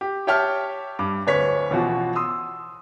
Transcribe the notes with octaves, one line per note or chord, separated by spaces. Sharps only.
G4
G4 C#5 E5 G5 A5 F6
G2 D6
D1 B4 C#5 B6
A1 B2 F3 F#4
C6 D#6 E6